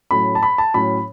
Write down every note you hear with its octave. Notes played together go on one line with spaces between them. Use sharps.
A2 F#3 A3 C#4 B5
A5
B5
A5
A2 F#3 C#4 B5